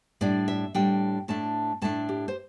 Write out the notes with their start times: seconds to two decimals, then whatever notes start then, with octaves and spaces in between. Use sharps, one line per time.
0.21 A2 G3 D4 D5
0.48 E5
0.75 A2 G3 D4 G5
1.28 A2 A3 D4 A5
1.82 A2 A3 D4 A5
2.09 G4
2.28 C5